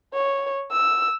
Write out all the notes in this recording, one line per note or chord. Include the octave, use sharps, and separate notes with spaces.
C#5
E6